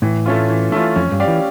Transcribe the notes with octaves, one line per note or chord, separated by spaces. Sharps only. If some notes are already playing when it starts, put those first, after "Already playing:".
A2 E3
A3 C#4 F4
E3
A3 C#4 F4
F2 C#4
G2
G4 D5 F5
E3